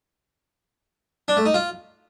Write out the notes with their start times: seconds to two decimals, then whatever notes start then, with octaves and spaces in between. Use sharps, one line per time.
1.28 D4
1.37 A3
1.46 D#4
1.54 F4